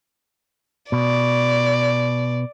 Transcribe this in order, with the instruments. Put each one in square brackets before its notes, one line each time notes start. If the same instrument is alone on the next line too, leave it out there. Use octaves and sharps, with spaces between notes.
[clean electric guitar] B2 [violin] D5